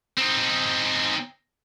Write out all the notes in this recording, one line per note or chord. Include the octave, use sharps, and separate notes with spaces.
C4 D#4